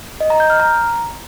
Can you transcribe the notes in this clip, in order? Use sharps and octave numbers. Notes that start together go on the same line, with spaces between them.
D#5
A#5
G6
F6
A#5